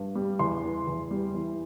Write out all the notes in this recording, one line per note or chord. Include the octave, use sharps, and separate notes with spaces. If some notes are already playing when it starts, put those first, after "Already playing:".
Already playing: G2
G3
E2 C6
E3
E2
G3
E3